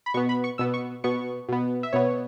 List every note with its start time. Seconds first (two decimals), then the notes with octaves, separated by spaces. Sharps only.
0.06 B5
0.14 B2 C#6
0.17 B3
0.29 B5
0.44 C#6
0.58 B2 B3 E6
0.74 C#6
1.04 B2 B3 C#6
1.49 B2 B3
1.83 E5
1.93 B2 B3 C#5